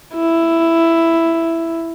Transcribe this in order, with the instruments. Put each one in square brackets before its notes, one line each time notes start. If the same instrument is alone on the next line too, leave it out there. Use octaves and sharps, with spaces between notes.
[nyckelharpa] E4